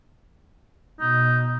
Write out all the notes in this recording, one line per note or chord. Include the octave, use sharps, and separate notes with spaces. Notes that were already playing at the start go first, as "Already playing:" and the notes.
B2 D#4